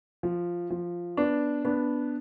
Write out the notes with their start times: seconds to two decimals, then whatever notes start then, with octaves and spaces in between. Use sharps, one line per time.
0.23 F3
0.70 F3
1.17 B3 D4
1.65 B3 D4